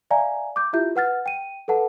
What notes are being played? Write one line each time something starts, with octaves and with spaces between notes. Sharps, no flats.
D5 E5 F5 G#5 A#5
D6 G6
E4 F4 G4 E5 G6
B4 F#5 F6 A6
G5 D#7
A4 B4 F#5 A5